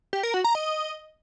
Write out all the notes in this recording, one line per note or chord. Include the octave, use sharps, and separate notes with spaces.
G4
A#4
F#4
A#5
D#5